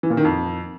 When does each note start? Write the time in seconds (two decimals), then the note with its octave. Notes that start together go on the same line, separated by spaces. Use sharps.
0.03 E3
0.10 A#2
0.17 D#3
0.24 F2